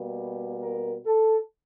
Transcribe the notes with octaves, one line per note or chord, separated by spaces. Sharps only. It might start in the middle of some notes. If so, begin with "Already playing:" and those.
Already playing: B2 G3 A#3
A#4
A4